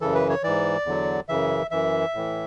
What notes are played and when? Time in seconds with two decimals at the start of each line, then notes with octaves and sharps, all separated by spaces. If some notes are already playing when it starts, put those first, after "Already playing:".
0.01 F#2 C#3 E3 A4
0.15 B4
0.30 C#5
0.43 G#2 E3 D5
0.86 E2 D3 F#3
1.28 F#2 C#3 E3 E5
1.71 F#2 E3 E5
2.14 A2 E3